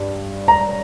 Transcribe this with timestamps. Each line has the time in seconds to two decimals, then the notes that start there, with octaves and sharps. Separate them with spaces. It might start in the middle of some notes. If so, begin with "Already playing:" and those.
Already playing: G2
0.48 A#5